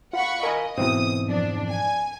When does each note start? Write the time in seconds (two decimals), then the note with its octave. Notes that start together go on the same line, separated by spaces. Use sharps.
0.13 F4 F#5 B5 C#6
0.43 A#4 D#5 G#5 B5
0.78 G#2 B2 E3 C4 D#6
1.27 F2 D4
1.69 G#5